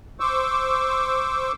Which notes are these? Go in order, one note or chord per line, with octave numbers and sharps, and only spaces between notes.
C5 C#6 D6 E6